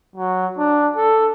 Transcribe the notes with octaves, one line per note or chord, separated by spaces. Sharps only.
F#3
D4
A4